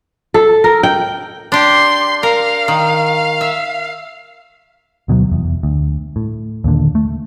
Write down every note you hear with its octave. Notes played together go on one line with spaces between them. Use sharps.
A4
A#4
G5
D4 G4 C6
A#4 F5
D#3
E5
D2 B2 F3 F#3
F1 E2
D2
A2
D#2 A#2 D3
A3